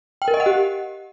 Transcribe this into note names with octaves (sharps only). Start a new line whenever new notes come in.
G5
A#4
D#5
F#5
G4